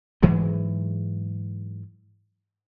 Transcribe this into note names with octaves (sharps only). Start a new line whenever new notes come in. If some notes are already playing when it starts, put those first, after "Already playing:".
G#2 E3 F#3 G#3